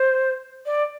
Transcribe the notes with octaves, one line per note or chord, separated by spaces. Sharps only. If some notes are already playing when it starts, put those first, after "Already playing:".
Already playing: C5
D5